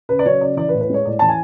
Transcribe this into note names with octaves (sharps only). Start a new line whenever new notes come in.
C#3 B4
D5
F#3 C#5
C#3 D5
E3 D5
B4
A2
B4
G#3 C#5
A2 D5
E3 A5
G#5